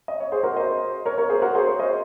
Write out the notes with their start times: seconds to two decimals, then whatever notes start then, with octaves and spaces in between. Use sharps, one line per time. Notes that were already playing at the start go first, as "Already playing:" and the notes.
0.08 D#5
0.20 C#5
0.32 G#4 C5
0.43 F#4 A#4
0.56 C5 D#5
1.06 A#4 C#5
1.18 A#4 C#5
1.30 G#4 C5
1.42 F#4 A#4
1.55 G#4 C5
1.67 A#4 C#5
1.79 C5 D#5